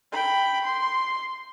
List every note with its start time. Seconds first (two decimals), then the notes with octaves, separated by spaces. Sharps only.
0.12 G5 B5
0.64 C6